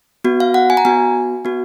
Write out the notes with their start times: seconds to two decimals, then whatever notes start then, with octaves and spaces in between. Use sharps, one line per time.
0.24 B3 F#4
0.40 F5
0.54 F#5
0.70 G#5
0.77 A#5
0.85 B3 F#4 G#5
1.45 B3 F#4